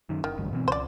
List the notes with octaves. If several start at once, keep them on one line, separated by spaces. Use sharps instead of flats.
F#2 D#3
F#1 D#3
D1 A1 G2
B2 E3 C4
C#2 C5 D5